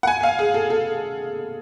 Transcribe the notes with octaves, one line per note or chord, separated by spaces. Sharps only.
F#5
G#5
F5
G#4
A4
A4